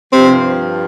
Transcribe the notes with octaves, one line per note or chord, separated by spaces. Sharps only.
G2 C3 F3 C4